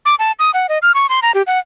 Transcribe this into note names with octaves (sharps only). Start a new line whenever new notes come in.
D6
A5
D#6
F#5
D#5
F6
C#6
C6
A#5
G4
F#5